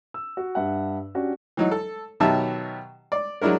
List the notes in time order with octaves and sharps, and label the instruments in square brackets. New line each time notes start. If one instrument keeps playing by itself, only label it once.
[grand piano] E6
F#4
G2 E5 F#5
C#4 D4 F#4 G4
[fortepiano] E3 F#3 D#4
A4
B2 D#3 F#3 G4 E5 A5
D5
F#3 G#3 D4 E4 A#4